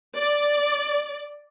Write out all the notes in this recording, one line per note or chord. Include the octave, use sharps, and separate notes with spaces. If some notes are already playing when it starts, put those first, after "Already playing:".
D5